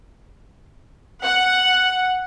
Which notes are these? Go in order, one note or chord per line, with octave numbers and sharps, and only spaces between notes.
F#5